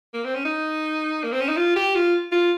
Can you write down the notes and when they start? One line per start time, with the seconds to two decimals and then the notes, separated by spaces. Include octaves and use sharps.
0.14 A#3
0.24 C4
0.35 C#4
0.45 D#4
1.24 A#3
1.32 C4
1.41 C#4
1.49 D#4
1.57 F4
1.76 G4
1.95 F4
2.32 F4